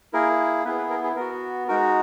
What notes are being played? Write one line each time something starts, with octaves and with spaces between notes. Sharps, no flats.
A#3 E4 G#4 A#4
B3 E4 G#4 B4
B4
A#4
G#4
B3 F#4 A#4
G#3 D#4 F#4 A#4